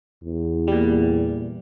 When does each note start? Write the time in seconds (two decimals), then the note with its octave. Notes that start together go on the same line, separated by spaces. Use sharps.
0.24 E2
0.68 A#2 G3